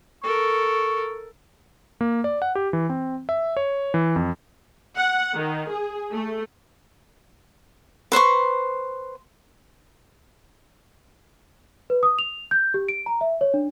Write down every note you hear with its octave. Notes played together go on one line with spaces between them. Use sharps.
A4 A#4 C#6
A#3
D5
F#5
G4
E3
C4
E5
C#5
E3
F2
F#5
D#3
G#4
A3
B4 C5 C6 C#6
B4
D#6
F7
G6
G4
D7
A#5
E5
C#5
D4